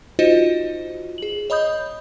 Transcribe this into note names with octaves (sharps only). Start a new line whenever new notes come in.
D#4 F4 F#4 C5 D#5
G#4 F#7
C#5 D#5 B5 D#6 G6